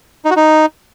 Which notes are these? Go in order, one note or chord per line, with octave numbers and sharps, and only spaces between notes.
D#4
F#4
D#4